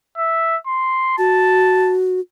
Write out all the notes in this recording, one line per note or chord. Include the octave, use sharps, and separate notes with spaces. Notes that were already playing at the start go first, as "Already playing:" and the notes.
E5
C6
F#4 A5